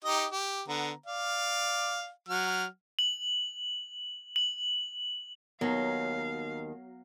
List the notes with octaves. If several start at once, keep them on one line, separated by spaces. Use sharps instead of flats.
D#4 G4 D#5
G4
D3 B3 A#5
D5 F5
F#3 F#5 F6
F#7
F#7
D#2 D#3 F#3 B3 F5